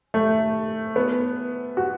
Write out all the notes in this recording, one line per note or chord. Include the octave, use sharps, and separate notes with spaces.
A3
B3
F#4